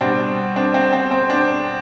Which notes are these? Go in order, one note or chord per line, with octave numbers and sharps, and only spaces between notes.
B2 G3 C4 D4
C4 D4
C4
C4
C4
C4 D4